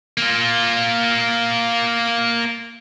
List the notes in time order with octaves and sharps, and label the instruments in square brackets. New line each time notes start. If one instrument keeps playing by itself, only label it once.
[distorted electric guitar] A#3 F4